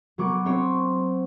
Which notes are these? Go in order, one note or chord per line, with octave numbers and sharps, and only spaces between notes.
F#3 A#3 B3 C#6 D6
C4 C5 C#5